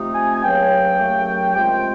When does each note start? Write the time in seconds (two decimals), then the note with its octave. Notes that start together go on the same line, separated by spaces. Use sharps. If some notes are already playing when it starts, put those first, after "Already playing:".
Already playing: C3 F3 A3 C4 D#4
0.15 G#5
0.36 G#5
0.43 C#2 C#3 F#3 A#3 C#4 G5
0.99 D#2 C#3 F#3 A3
1.55 C3 F3 G#3 G5